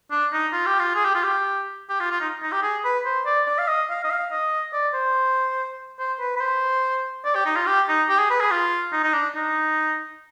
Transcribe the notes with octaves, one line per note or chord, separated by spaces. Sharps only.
D4
D#4
F4
G4
F4
G#4
G4
F4
G4
G4
F4
F4
D#4
D#4
G4
G#4
B4
C5
D5
D5
F5
D#5
F5
D#5
F5
D#5
D5
C5
C5
B4
B4
C5
D5
G4
D#4
F4
G4
D#4
G4
G#4
B4
G#4
F4
D#4
D#4
D4
D#4